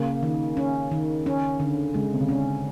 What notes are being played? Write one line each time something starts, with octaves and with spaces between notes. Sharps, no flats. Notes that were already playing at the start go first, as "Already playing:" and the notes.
Already playing: C#3 A#3
D#3
C#4
D#3
C#4
D3
C#3 G#3
C3
C#3
D3 C#4